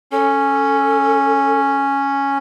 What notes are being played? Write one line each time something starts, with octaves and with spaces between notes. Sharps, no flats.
C#4 A4